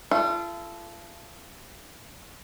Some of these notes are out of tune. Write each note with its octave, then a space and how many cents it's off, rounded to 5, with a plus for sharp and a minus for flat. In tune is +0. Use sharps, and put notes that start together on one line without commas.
F4 -40 A4 -15